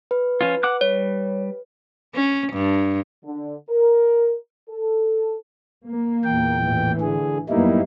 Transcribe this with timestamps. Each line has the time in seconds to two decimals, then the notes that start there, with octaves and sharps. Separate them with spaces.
0.11 B4
0.41 F3 C#4 F4
0.63 F#5 D6 F#6
0.81 G3 C#5
2.15 C#4
2.53 G2
3.23 D3
3.68 A#4
4.68 A4
5.86 A#3
6.24 E2 A#2 G5
6.62 A1 E3
7.00 D3 G#4
7.49 F#2 G3 A#3 B3 D#4 E4